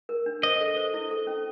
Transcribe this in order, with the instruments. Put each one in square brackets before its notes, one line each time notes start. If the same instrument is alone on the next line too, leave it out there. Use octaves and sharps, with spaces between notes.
[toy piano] A#4
D4
[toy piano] C5 [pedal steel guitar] D#5
[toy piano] A4
C5
E4
A4
C#4